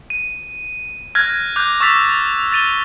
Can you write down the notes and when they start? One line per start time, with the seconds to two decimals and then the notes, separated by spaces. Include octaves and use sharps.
0.10 D#7
1.15 F6 F#6 G#6 A#6
1.56 D6 F#6 G6
1.81 C#6 E6 A6 B6 F7
2.09 F7
2.52 A6 D#7 G7